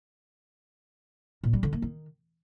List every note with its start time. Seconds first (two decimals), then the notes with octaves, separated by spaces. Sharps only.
1.43 A#2
1.53 G3
1.63 D3
1.73 A#3
1.82 D#3